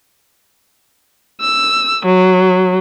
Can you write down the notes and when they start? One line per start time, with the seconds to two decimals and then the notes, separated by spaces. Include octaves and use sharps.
1.42 E6
2.06 F#3